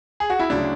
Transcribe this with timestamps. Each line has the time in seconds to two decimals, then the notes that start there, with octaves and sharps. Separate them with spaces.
0.20 G#4
0.30 F#4
0.39 E4
0.50 D2 C#3 F#3 D4